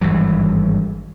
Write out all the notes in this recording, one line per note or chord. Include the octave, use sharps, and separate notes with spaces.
G#1 G2 E3 F#3